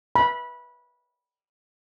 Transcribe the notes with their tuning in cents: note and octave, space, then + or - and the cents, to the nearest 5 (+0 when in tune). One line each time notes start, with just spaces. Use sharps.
B5 -15